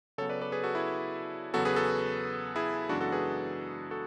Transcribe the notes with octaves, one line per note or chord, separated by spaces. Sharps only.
C#3 F#3 B3 A4 C#5
B4 D5
B4 D5
G#4 B4
F#4 A4
E4 G#4
E2 C#3 F#3 B3 F#4 A4
G#4 B4
F#4 A4
E4 G#4
F#2 C#3 E3 G#3 B3 D4 F#4
F#4 A4
G#4 B4
F#4 A4